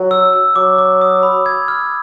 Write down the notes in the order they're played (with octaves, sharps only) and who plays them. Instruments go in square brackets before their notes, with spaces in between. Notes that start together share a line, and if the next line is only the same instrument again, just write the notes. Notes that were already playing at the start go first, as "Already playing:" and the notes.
Already playing: [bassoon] F#3
[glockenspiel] E6
E6
[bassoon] F#3 [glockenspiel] D6
[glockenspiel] D6
D#6
B5
G#6
F6